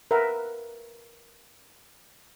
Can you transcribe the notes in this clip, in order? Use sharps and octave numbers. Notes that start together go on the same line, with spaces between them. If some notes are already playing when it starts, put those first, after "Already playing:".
A#4 B4 E5 F#5 A#5